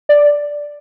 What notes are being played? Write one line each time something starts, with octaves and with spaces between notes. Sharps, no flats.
D5